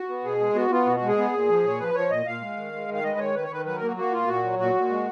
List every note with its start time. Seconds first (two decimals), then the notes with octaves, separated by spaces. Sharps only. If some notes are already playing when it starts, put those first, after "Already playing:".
Already playing: F#4
0.09 B3
0.24 B2 G#4
0.40 G#3
0.55 B3 F#4
0.71 B3 F4
0.86 B2 F#4
0.97 F#4
1.02 G#3
1.08 G#4
1.18 B3
1.33 A#2
1.49 F3
1.64 A#2 C#5
1.79 F3 B4
1.95 F3 C#5
2.10 A#2 D#5
2.26 A#2 F5
2.41 G#3
2.57 D#3
2.73 G#3
2.89 D#3
2.94 F5
3.04 G#3 D#5
3.12 B4
3.19 D#3 C#5
3.35 D#3 B4
3.43 C#5
3.50 D#3 B4
3.66 F#3 B4
3.77 A#4
3.82 A#3 F#4
3.97 A#3 F#4
4.13 A#2 F4
4.27 A#2 F#4
4.43 F#3
4.58 A#2 F#4
4.75 A#2
4.90 G#3